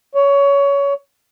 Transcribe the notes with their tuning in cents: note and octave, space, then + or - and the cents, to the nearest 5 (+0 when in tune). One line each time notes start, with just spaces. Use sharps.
C#5 +20